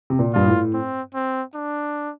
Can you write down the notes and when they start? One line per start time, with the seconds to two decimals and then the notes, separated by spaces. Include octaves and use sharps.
0.10 C3
0.19 A#2
0.33 G2 F4
0.47 A2
0.74 C4
1.14 C4
1.55 D4